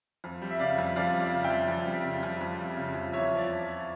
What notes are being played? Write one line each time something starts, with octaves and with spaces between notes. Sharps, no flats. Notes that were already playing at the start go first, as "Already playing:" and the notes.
F2
G3
E5
C#3 D5 F5
F2
F2 D5 F5
G3
D5 F5
C#3
E5 G5
F2
F2
G3
C#3
F2
F2
G3
C#3
F2
E2 C#5 E5
F3
D5